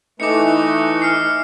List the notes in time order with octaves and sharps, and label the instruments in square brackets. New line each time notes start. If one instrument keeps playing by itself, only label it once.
[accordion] E3 A3 [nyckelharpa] D#4 [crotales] D6 C#7
[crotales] F6 C7 C#7